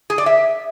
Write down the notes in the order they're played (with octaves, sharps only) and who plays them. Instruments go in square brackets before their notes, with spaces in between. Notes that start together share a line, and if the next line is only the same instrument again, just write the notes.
[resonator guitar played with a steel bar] G#4
D5
E5